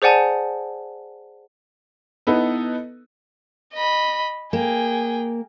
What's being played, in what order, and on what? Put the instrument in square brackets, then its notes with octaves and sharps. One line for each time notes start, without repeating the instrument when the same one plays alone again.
[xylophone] G#4 C5 D5 F#5 G#5 A5
[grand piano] B3 D#4 E4 A4 B4
[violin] D#5 B5
[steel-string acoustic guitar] A#3 [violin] G#4 G5